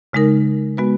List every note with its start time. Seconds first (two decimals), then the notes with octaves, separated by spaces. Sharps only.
0.13 C#3 G#3 D#4 A#4
0.77 G#3 B3 F#4 B4